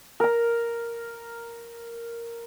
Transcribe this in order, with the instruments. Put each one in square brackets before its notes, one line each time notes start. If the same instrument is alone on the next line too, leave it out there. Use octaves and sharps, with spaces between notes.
[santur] A#4 A#5